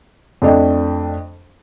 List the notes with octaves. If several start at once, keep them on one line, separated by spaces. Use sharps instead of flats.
F2 A3 D4 D#5 G5